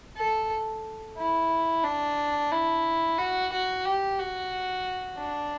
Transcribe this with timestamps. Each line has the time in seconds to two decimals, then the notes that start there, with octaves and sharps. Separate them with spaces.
0.17 A4
1.17 E4
1.84 D4
2.52 E4
3.18 F#4
3.52 F#4
3.85 G4
4.19 F#4
5.19 D4